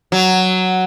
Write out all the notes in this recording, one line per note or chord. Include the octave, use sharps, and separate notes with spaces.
F#3